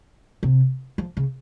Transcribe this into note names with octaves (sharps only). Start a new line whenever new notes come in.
C3
F3
C#3